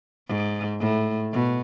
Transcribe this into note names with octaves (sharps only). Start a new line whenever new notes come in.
G#2
A2
B2